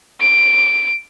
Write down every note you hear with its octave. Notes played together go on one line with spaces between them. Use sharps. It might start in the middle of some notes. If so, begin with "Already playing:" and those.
D7